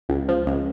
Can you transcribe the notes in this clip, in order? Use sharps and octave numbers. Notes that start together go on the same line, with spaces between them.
C#2
F3
C#2